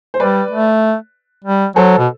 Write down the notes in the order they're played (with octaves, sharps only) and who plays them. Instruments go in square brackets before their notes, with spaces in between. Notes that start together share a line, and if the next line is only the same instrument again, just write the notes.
[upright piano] C5
[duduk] G3 [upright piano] B4 D5
[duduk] A3
G3
[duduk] F#3 [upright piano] A4 C5
[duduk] B2